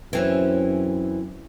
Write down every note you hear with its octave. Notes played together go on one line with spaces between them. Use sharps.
F#2 E3 C4 C#4